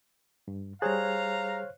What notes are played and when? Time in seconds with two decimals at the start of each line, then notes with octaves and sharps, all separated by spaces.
0.48 G2
0.82 G3 G#4 C5 C#5 F5 A#5 F#6